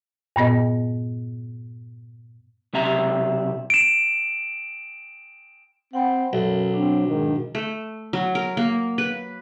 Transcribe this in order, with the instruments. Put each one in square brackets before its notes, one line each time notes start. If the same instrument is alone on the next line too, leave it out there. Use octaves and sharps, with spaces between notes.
[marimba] G2 A#2 B3 D#5
[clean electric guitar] B1 C3 E5 A#5
[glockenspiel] D7 E7
[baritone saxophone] C4 [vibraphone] F#5 G5 B5
[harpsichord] B1 [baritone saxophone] F#2 [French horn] F#3 [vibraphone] A4
[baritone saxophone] C4 [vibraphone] D4
[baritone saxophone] G#2 [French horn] D#3
[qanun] A3
F#3
A#4
A#3
B4